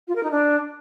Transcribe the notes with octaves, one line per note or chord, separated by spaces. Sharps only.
F4
A#4
D#4
D4